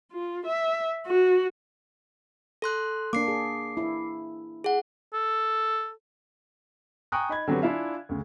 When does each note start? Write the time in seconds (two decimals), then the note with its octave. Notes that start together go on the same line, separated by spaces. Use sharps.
0.12 F4
0.46 E5
1.07 F#4
2.62 A4 C6 F#6
3.13 A#3 D4 D6 C7
3.28 G#4
3.77 E4
4.64 G#4 F#5
5.13 A4
7.12 G5 G#5 A#5 C#6 D#6 F#6
7.29 D#4 B5 G#6
7.47 D3 F#3 C4 G4 B4
7.61 D4 E4 F4 E5 F5 G#5
8.09 D2 C#3